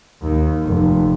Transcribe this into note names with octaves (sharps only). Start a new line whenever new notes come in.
D#2
F1